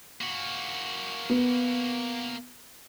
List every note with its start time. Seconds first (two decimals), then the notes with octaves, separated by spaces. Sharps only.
0.21 A#3 F#4
1.30 B3